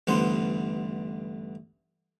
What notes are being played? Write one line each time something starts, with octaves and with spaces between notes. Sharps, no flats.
A1 G2 D3 B3 C5